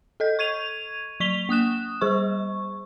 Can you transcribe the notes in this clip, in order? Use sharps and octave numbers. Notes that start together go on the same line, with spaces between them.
A4 D#5 G6
C#6 G#6 D#7 F7
F#3 C#6 B6 F7 G7
A#3 D#6 F#6 E7
G3 G#4 C5 C#6